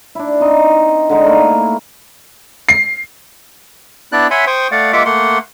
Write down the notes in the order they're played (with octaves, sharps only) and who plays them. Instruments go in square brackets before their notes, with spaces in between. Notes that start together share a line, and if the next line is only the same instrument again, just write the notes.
[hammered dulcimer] D4 E4
C4 D#4 D#5
D3 G#3 D#4
A3 A#3 E4
[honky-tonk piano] C7
[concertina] B3 D4 E4 D5 F#6
C#5 E5 F#5 G#5 B5 C6
C5 G5 C#6 D#6
A3 D5 F5 F#5
G#3 A#3 F4 E5 F#5 D6
A3 A#3 F#5 C6